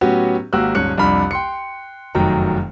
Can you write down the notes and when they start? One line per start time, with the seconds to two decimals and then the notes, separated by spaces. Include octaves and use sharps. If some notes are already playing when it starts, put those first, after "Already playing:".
0.01 A2 F#3 B3 C#4 F#4 G4
0.53 G#1 A#3 F#4 G4 E6 F#6
0.75 D#1 G#2 C#4 F#6 C#7
0.98 C2 F2 D4 B5 F6
1.31 G5 C6 C#7
2.15 F1 F#2 D#3 F#3 G5 A#5